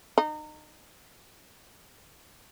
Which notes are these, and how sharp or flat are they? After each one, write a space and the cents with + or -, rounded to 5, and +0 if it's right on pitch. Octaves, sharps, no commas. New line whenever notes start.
D#4 -30